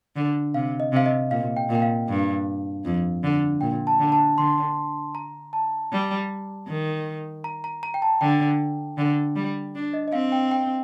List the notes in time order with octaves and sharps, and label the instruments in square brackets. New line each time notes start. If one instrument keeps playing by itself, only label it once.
[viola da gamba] D3
[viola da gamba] C3 [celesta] F5
[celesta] D#5
[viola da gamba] C3 [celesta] F5
[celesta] D#5
[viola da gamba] A#2 [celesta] F5
[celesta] G5
[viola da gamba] A#2
[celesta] G5
F5
[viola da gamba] G2
F2
D3
[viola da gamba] A#2 [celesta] G5
[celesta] A5
[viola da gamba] D3
[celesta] A5
[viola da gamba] D3 [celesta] C6
[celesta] A#5
A5
[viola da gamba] G3
D#3
[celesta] A#5
A#5
A#5
G5
A5
[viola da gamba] D3 [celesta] G5
[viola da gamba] D3
G3
D4
[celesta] D#5
D#5
[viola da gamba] C4 [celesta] F5
[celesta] G5
G5